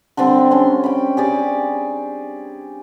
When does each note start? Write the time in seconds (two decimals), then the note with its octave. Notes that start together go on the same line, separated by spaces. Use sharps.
0.17 D3 G3 C4 D4
0.51 C#4 C6
0.84 G5 B5
1.17 G4 G#4 D5